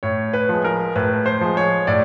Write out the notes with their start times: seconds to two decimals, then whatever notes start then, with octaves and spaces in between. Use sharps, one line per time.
0.03 A2 C#5
0.33 B4
0.49 F3 G#3
0.64 A#4
0.95 A2 B4
1.26 C5
1.41 F3 G#3
1.57 C#5
1.87 A2 D5